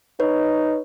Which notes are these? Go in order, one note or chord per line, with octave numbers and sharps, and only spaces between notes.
D#4 B4 C#5